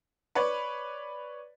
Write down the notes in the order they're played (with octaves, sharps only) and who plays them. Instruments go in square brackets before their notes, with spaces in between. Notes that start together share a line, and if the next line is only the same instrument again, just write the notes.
[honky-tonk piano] B4 C#5 D5